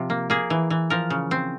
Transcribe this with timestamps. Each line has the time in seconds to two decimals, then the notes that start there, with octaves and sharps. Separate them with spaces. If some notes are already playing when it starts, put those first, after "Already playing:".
Already playing: C3 F3
0.10 A#3
0.30 A#3 G#4
0.50 E3
0.70 E3
0.90 F3 A#4
1.10 C#3
1.31 C4